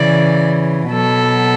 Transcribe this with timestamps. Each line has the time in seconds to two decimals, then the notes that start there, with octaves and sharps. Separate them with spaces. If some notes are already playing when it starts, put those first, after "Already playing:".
Already playing: C#3 E3 D5
0.91 B2 F#3 A4